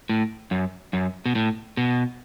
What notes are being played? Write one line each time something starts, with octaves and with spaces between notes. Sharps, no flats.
A2
F#2
F#2
B2
A2
B2